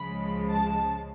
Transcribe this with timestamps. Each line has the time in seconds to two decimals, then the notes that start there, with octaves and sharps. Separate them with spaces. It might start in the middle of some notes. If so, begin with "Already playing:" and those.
Already playing: C#2 C#3 F3 G#3 B5
0.48 A5